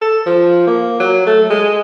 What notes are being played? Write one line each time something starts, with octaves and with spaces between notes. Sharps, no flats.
A4
F3
A#3
F#3
A3
G#3